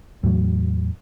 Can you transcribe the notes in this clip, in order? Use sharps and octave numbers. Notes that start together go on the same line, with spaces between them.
E2 A2 F#3